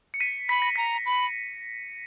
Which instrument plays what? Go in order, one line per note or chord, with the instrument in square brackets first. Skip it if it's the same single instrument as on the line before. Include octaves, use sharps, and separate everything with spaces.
[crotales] C#7
B6 D#7
[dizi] B5 [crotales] B6
[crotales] A#6
[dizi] A#5 [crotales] B6
[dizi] B5